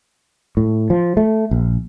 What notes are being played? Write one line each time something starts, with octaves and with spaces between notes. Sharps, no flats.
A2
F3
A3
A#1